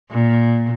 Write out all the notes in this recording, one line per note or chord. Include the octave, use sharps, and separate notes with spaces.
A#2